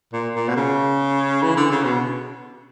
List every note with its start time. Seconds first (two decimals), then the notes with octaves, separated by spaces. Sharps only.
0.13 A#2
0.35 A#2
0.49 B2
0.56 C#3
1.43 E3
1.57 D3
1.71 C#3
1.84 B2